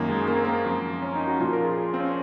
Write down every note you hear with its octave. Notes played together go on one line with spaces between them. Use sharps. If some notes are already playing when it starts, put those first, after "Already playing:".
Already playing: F#2 D#3 A#3
G#3
A#3
C4
A#3
F#2 F3
C#4
D#4
F#4
A#2 F3 F4
A#4
G#4
C4
C#4